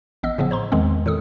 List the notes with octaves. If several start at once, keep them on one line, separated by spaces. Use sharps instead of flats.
A1 B3 D#5 E6
A2 C#3 F3 B3
C5 A#5 C6
E2 D#3 G#3 B3 C4
A2 D#3 A4 D#6